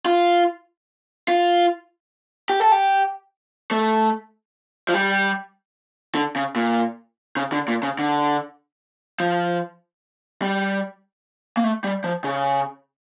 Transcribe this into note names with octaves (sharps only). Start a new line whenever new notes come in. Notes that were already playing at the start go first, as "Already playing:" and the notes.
F4
F4
G4
A4
G4
A3
F3
G3
D3
C#3
A#2
C#3
D3
A#2
C#3
D3
F3
G3
A#3
A3
G3
F3
C#3